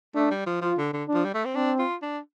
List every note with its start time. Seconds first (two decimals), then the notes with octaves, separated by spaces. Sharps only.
0.15 A3 D4
0.31 G3
0.46 F3
0.61 F3 F4
0.78 D3
0.93 D3
1.08 D4
1.14 F3
1.25 G3
1.34 A3
1.45 C4
1.55 C4 D4
1.79 F4
2.02 D4